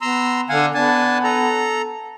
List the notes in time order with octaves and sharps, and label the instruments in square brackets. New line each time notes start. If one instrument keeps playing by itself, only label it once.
[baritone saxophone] B3 [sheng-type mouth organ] A#5 C6 E6
[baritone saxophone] D3 [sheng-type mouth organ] F5 F#5 G#5
[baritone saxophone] B3 [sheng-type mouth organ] D4 G#5 A5
[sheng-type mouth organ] A4 A#5